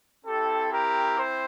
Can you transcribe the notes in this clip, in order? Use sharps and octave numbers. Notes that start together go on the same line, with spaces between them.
C4 E4 G4 A4
G4 A#4
C5